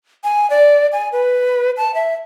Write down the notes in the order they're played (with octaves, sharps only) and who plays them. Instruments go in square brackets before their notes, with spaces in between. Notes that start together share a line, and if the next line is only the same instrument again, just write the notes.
[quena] G#5
D5
G#5
B4
A5
E5